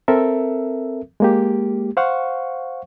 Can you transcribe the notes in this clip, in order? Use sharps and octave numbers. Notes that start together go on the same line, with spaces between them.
C4 A4 A#4 E5
G#3 A#3 G4
C5 F5 F#5 C#6